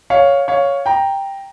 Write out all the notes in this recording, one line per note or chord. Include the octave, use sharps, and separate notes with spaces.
C#5 F5
C#5 F5
G5 A#5